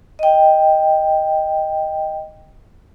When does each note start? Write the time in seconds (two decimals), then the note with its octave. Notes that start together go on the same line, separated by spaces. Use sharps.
0.19 D#5 G5